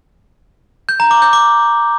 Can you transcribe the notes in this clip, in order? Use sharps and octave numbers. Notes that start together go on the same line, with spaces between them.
G6
A#5
D6
G6
D6